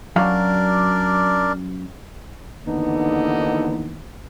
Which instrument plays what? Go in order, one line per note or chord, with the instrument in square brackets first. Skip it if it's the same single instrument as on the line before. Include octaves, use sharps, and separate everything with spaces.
[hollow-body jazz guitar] F#2 F#3 F5 [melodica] D4 A#4 D5
[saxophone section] D#2 D3 E3 B3 D#4